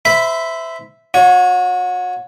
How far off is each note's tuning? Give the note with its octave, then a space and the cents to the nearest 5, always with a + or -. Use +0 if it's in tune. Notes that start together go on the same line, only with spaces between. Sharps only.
C5 -30 E5 +0 B5 +0
F#4 -35 C#5 +10